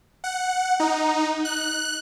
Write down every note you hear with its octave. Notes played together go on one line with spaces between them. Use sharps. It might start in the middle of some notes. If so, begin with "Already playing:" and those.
F#5
D#4
F#6